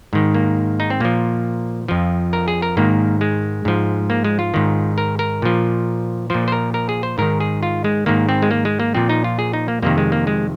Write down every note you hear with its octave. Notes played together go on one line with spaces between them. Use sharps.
G#2 D#3
A#3
D#4
C4
A#2 F3 A#3
F2 F3
A#4
G#4
A#4
G#2 D#3 A#3
G#3
G#2 F3
A#3
G#3
F4
G#2 D#3
A#4
A#4
A#2 F3
A#2 F3 C5
C5
A#4
A#4
G#4
C5
G#2 D#3 A#4
G#4
F4
G#3
G#2 D#3 A#3
C4
G#3
A#3
G#3
A#3
A#2 F3 C4
D#4
F4
G#4
D#4
A#3
F2 C3 D#3 A#3
G#3
A#3
G#3